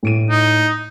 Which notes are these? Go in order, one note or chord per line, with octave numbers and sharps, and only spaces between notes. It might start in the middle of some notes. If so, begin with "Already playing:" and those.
A2 D7 D#7
D#4